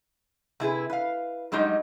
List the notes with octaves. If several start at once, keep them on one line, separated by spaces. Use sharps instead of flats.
C3 E4 G#4 B4
B4 F5
G2 F#3 G#3 D#4 G4 D#5